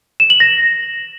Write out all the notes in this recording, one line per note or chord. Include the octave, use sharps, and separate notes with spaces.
E7
F#7
A#6